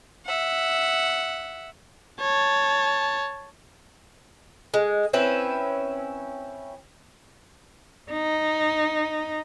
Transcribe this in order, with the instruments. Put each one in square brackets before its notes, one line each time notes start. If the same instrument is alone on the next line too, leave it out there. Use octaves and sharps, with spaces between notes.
[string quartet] E5 F#5
[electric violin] C#5 A5
[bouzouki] G#3
C4 C#4 E4 B4
[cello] D#4